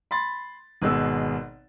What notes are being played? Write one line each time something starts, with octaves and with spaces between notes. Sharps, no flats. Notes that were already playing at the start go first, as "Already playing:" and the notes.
B5 C6 A6
G#1 B2 G#3 E6